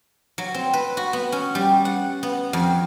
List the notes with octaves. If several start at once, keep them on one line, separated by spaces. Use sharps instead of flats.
F#3
C4
B4
F#4
B3
C#4
G3
F#5
B3
F2